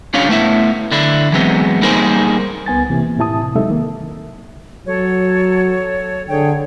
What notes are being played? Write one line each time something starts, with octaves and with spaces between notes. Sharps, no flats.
G3 C#4 D4 F4 C#5 F5
A3 B3 E4 E5
D3 D4 E4
E3 F#3 G#3 B3 C4
G3 A#3 D#4 G#4 A#4 C5
C#2 B3 G#5 A6
C3 E3 A#3
A2 C3 E4 A5 D#6
C3 F#3 G#3 D#4 A4 E5
D#3 A#3
F#3 A4 C#5
D3 G#4 C#5 G5